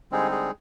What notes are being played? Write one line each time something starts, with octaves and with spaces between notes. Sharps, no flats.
D3 G3 G#3 C4 D#4 G#4
G#3 G#4